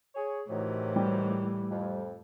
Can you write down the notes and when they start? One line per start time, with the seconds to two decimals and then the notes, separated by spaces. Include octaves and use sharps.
0.15 G#4 C#5
0.49 A2 C3 D#3 E3 F#3
0.96 G3
1.69 F2